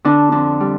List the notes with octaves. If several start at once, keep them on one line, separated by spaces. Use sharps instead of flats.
D3 D4
F2 D4
G3